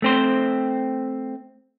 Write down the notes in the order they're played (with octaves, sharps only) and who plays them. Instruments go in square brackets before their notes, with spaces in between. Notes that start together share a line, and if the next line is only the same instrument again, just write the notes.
[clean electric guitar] A3 C4 C5